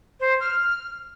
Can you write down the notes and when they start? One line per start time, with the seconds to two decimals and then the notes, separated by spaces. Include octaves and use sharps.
0.20 C5
0.40 F6